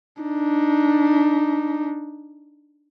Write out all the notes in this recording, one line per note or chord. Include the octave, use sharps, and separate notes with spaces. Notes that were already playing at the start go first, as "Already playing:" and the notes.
D4 D#4